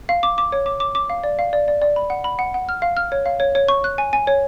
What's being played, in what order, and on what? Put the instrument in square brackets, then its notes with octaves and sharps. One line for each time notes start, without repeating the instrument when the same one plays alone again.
[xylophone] F5
D6
D6
C#5
D6
D6
D6
F5
D5
F5
D5
D5
D5
B5
F#5
B5
F#5
F#5
F6
F5
F6
C#5
F5
C#5
C#5
C#6
F#6
G#5
G#5
C#5